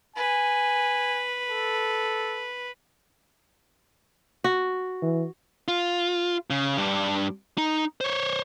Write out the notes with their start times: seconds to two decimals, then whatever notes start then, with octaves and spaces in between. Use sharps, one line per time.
0.16 B4 G#5
1.50 A4
4.44 F#4
5.02 E3
5.68 F4
6.50 C#3
6.78 G2 D4
7.58 D#4
8.01 C5 C#5